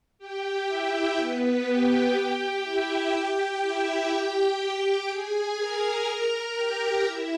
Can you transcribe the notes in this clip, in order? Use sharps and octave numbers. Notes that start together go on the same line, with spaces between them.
G4 G5
E4 E5
B3 B4
G4 G5
E4 E5
G4 G5
E4 E5
G4 G5
G#4 G#5
A#4 A#5
G4 G5
E4 E5